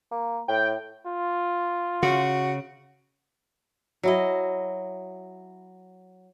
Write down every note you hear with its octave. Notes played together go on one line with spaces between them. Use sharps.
A#3
A2 G5
F4
C#3 F#4
F#3 E4 D#5